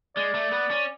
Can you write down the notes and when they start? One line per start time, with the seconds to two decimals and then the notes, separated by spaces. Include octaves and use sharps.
0.16 G#3 D5
0.35 A3
0.52 B3
0.71 C#4